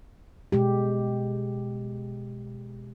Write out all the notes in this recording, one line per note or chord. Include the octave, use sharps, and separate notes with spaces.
B2 G#3 G4